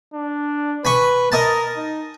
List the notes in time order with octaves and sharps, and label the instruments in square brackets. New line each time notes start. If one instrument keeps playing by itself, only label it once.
[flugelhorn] D4
[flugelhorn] B4 [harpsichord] G#5 B5 C#6
[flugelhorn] A#4 [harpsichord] D#5 G#5 A5
[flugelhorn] D#4